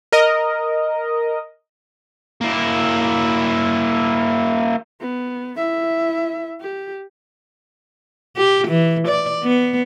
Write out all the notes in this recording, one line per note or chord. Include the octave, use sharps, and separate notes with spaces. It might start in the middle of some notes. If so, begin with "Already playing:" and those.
A#4 D#5
A#3 E4
B3
E4 E5
G4
G4
E3
D5
B3